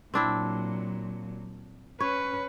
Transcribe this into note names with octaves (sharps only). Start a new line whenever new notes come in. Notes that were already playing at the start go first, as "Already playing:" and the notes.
A#2 F#3 C4 D4 E4
C#4 B4 C#5